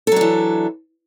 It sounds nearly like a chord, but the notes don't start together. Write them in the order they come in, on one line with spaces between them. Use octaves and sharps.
A4 F#3 D4 E3